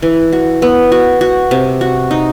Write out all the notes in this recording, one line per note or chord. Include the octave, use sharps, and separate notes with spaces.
E3
F#4
B3
F#4
F#4
C3
F#4
D#4